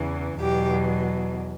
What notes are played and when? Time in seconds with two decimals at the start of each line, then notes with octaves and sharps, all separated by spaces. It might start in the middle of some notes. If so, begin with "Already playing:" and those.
Already playing: E2 C#3 E3
0.39 E2 B2 F#3 G4